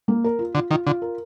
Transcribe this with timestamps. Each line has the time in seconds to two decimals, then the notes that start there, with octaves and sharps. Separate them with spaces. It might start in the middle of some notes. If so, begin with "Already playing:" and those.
0.08 A#3
0.24 A#4
0.39 F4
0.55 D3 F4
0.71 D#3 F4
0.87 D3 F4
1.02 A#4